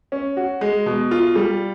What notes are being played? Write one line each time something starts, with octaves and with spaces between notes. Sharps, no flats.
C#4
F#4
G#3
B2
F4
G3